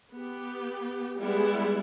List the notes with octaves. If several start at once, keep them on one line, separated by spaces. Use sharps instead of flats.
B3 G4
G3 G#3 B3 E4